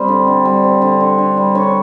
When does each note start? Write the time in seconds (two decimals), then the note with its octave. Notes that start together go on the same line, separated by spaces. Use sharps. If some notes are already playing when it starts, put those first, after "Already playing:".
Already playing: G3 C4
0.08 D3
0.27 D3
0.45 G3
0.64 C4
0.82 D3
1.00 D3
1.18 D3
1.37 G3
1.55 D3 C#5